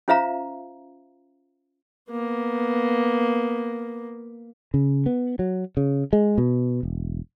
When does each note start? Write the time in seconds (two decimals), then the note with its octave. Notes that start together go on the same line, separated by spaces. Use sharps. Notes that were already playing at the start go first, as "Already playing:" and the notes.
0.08 C#4 F4 C5 E5 F5 A#5
2.11 A#3 B3
4.74 C#3
5.06 B3
5.39 F#3
5.77 C#3
6.13 G#3
6.38 B2
6.83 E1